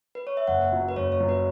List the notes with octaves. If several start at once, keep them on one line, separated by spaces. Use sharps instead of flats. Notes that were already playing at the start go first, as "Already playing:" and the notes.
B4
C#5
E5
F#1 F#5
F#2 F#3
B4
F#1 C#5
C#5
F#2 F#3
B4